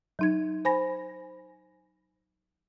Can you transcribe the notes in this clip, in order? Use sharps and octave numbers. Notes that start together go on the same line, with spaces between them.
F#3 D#4 G#6
C5 G#5 B5 A#6